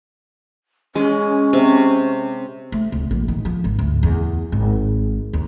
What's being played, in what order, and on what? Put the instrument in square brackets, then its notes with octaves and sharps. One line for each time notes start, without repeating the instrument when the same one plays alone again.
[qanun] G#3 [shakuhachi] C#4
[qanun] C3
[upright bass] A3
D1
A#1
D#3
F3
G#1
D2
E2
G#1
D#2